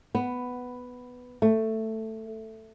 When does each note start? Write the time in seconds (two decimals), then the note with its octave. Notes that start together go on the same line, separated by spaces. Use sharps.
0.15 B3
1.42 A3